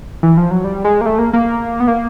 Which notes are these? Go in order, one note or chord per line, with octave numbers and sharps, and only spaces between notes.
E3
F3
F#3
G3
G#3
A#3
A3
A#3
A#3
B3
A#3